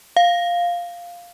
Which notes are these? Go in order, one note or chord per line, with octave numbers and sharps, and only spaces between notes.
F5